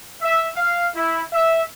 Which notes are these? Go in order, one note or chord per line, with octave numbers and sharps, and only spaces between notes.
E5
F5
E4
E5